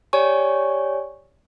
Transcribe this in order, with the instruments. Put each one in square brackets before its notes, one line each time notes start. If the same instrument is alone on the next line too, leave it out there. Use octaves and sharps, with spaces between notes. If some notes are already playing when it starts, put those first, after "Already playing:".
[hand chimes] G4 C#5 D5 G#5 C#6